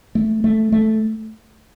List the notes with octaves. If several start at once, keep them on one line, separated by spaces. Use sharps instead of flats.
A3
A3
A3